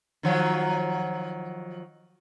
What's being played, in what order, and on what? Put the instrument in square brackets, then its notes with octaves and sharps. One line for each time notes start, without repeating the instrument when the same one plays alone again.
[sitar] D#3 F3 F#3